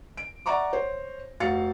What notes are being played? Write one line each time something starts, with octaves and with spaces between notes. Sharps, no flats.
D7
D5 E5 F#5 A#5 C#6 D6
C5 C#5
F1 F#4 F5 A6 C#7